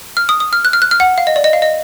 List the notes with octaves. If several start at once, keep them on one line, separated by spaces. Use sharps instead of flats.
F6
D#6
D#6
F6
F#6
F6
F#6
F6
F#5
F5
D#5
D5
D#5
F5
D#5